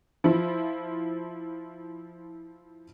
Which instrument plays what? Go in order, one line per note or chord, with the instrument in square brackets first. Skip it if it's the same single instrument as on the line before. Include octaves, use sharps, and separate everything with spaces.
[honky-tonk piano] F3 E4 F4